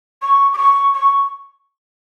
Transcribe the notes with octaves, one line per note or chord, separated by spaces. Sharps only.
C#6
D6
C#6
C#6